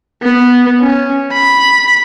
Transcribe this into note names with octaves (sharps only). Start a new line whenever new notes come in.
B3
C#4
B5